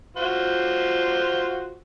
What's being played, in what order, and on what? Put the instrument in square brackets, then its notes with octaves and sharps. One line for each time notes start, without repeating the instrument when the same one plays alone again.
[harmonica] F4 F#4 C5